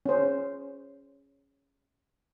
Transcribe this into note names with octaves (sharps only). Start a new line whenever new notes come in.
C#4 C5